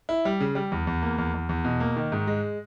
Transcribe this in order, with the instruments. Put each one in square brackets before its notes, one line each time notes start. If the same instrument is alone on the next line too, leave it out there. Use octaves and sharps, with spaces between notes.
[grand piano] E4
G3
C#3
G3
E2
E2
A#3
E2
E2
E2
B2
A#3
D#3
G#2
G#3